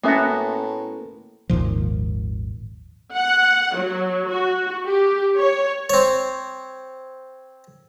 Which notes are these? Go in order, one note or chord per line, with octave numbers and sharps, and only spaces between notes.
A2 A#3 B3 C#4 F#4 E5
G#1 D#2 A#2 F3
F#5
F#3
F#4
G4
C#5
C4 C#5